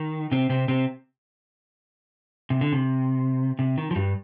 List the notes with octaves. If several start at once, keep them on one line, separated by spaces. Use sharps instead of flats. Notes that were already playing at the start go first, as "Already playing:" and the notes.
Already playing: D#3
C3 C4
C3 C4
C3 C4
C3
D3
C3
C3
D#3
F3
G2 G3